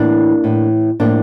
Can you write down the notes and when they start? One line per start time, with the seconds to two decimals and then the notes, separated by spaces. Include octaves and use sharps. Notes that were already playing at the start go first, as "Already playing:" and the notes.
Already playing: A2 E3 A#3 D4
0.44 A2 E3
1.00 A2 F3 A#3 D4